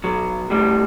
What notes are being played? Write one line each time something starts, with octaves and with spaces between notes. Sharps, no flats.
B1 F#3
A2 G3